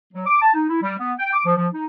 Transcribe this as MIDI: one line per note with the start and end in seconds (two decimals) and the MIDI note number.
0.13 0.26 54
0.27 0.41 86
0.42 0.54 81
0.54 0.66 63
0.69 0.81 64
0.82 0.94 55
0.99 1.13 59
1.19 1.32 79
1.33 1.45 86
1.46 1.54 53
1.57 1.67 53
1.74 1.85 63